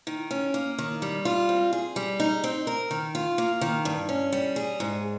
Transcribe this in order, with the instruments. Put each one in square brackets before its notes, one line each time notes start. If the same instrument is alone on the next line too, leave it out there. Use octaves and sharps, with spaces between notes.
[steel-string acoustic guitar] D#3
C#4
A#3
D#3
G3
F4
C4
G#4
G3
D#4
C4
A#4
D#3
F4
A#3
D#3
G2
C#4
G3
G#4
G#2